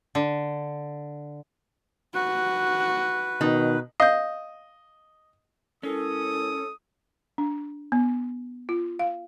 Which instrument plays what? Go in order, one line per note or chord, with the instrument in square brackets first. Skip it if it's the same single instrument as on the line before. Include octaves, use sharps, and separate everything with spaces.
[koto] D3
[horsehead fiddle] F#4 [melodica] B4
[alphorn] B2 [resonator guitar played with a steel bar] D#3
[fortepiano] D#5 [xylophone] F5 G6
[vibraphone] G#3 E4 A#4 [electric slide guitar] C#4 [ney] A4 [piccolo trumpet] D#6
[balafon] D4
B3
F4
F5